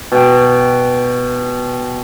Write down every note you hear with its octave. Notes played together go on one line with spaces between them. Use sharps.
B2 G5